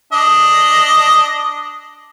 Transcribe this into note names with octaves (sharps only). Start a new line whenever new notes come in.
D4 D#5